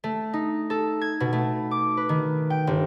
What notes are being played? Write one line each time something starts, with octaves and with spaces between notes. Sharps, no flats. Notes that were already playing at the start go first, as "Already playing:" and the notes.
A3
D#4
A4
G#6
B2
A3
D6
B4
D#3
G5
G1